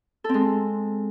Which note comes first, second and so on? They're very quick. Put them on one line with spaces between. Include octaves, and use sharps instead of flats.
A4 C4 G#3